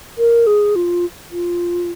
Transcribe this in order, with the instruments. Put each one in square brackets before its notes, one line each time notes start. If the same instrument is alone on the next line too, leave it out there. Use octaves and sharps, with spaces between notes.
[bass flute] A#4
G#4
F4
F4